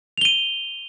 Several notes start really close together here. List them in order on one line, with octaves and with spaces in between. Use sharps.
F7 G7 D#7